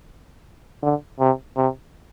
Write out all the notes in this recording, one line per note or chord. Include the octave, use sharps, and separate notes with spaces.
D3
C3
C3